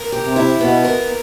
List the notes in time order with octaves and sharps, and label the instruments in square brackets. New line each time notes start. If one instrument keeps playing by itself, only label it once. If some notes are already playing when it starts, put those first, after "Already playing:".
Already playing: [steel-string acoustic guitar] A#4
G4
[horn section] C3
[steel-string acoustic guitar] E4
[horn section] B2 [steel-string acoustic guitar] B3
[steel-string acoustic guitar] A#4